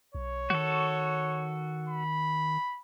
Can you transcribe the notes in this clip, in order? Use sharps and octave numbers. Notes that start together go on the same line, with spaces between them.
B1 C#5
D#3 F#4 A4
B5